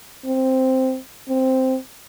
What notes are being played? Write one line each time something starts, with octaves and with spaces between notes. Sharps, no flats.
C4
C4